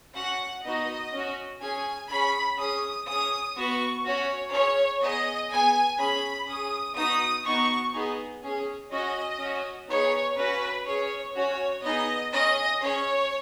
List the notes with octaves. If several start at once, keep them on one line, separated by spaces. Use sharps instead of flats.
C#4 F#4 F#5
B3 D#4 F#4 D#5
C#4 F#4
C#4 G#4 G#5
C#4 G#4 B5
C#4 G#4 D#6
C#4 G#4 D#6
B3 F#4 C#6
C#4 F#4 C#5
C#4 G#4 C#5
B3 G#4 D#5
B3 G#4 G#5
C#4 G#4 B5
C#4 G#4 D#6
B3 D#4 F#4 D#6
B3 D#4 F#4 C#6
B3 D#4 G#4
C#4 G#4
C#4 F#4 D#5
C#4 F#4
B3 D#4 G#4 C#5
C#4 F#4 B4
C#4 G#4 C#5
C#4 F#4 C#5
B3 D#4 G#4 D#5
C#4 G#4 D#5
C#4 G#4 C#5